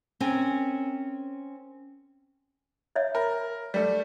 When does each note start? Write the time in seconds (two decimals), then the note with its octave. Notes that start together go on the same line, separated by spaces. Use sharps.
0.20 C4 C#4 A#4 G#5
2.96 C#5 E5 F5
3.15 A#4 B5
3.74 G3 A3